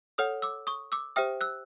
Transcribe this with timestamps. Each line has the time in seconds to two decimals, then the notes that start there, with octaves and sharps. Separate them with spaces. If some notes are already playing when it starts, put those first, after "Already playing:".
0.18 A4 C#5 F#5 D#6 F6
0.42 D6 E6
0.67 C#6 D#6
0.92 D6 E6
1.16 G4 C5 E5 G5 D#6 F6
1.41 E6 F#6